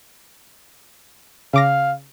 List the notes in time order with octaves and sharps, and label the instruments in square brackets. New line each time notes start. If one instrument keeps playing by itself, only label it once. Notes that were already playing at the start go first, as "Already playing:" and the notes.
[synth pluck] C#3 D6 A#6 [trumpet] F5